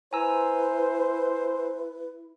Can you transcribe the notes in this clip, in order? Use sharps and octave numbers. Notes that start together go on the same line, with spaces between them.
E4 B4 C5 G#5 A#5 E6